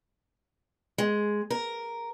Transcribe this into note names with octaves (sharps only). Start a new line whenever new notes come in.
G#3
A#4